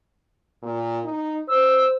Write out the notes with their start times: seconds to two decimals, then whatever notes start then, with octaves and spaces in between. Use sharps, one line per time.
0.62 A#2
1.04 D#4
1.48 C5 E6